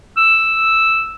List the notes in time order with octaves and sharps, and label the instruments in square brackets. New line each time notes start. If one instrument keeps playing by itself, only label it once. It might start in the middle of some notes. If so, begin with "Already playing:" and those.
[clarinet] E6